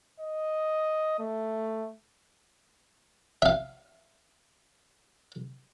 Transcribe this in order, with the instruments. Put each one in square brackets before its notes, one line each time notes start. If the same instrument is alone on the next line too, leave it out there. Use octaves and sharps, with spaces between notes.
[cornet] D#5
A3
[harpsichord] E5 F5